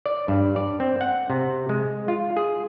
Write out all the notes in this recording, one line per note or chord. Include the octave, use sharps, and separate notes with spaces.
D5
G2
D5
C4
F#5
C3
G#3
F4
G#4